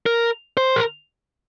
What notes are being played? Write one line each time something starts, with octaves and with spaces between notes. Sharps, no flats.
A#4
C5
A#4